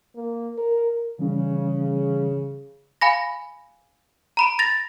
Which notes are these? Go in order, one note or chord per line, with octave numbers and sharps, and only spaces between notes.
A#3
A#4
C#3 E3 G3 C#4
F5 G#5 B5 A#6
A#5 B5 D7
A6 A#6 F7